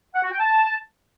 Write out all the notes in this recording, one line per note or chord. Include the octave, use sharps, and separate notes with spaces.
F#5
F#4
G5
A5